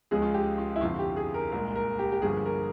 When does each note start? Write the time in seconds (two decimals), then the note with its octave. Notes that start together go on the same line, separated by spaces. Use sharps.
0.11 C#2 C#3 F3 G#3 G#4
0.22 F4
0.34 G4
0.58 F4
0.76 E4
0.81 G1 F2 C3 F3 F4
0.99 G4
1.16 G#4
1.34 A#4
1.52 C2 A#2 G#3 A#4
1.76 A#4
1.99 G4
2.12 G4
2.22 G1 G2 F3 A#3 G#4
2.46 A#4